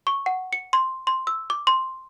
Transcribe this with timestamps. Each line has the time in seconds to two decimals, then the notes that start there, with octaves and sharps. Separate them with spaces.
0.07 C#6
0.26 F#5
0.53 C#7
0.73 C6
1.07 C6
1.27 E6
1.50 D6
1.67 C6